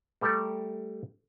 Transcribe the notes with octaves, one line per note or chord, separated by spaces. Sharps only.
G3 A3 G4 A4 A#4